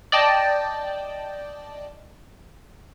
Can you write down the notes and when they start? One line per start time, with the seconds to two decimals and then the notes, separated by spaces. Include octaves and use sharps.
0.12 D5 D#5 G5 A5